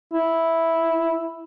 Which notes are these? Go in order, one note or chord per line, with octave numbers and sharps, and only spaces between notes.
E4